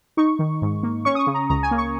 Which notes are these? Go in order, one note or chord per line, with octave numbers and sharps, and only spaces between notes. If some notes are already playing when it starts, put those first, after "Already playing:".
D#4 C#6
D#3
G#2
A#3
C#4 C#6
D#6
C#6
C#3
A#5
C#2 A#5
G#5
A#3
C#6